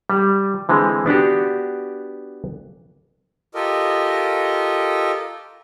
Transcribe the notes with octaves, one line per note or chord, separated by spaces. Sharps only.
G3
D3 E3 G#3 C4
B3 D4 F#4 G4
F4 G4 A4 A#4 D#5